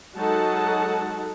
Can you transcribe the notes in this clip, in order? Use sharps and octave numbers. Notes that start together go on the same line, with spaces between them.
F#3 G#3 D#4 A4 F#5 A5